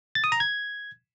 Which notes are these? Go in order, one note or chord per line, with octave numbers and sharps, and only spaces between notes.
A6
D#6
A#5
G#6